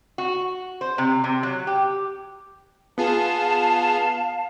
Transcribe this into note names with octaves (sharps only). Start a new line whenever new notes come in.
F#4
C5
C3
C3
F#3
G4
B3 F4 G#4 F5 A5